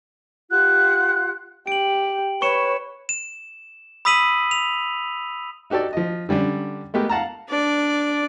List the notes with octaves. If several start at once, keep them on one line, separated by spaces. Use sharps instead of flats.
F4 G4 F#5 F#6
G4 D7 F#7
B4 C#5 C#6 C#7 E7
E7
B5 D#6 E6 B6 D#7 F#7
F7
D#4 F#4 G4 A4 D5
F3 D#5
D3 G3 C#4 D4
G#3 A3 B3 G4 A#4
F5 F#5 A5 A#5
D4 D5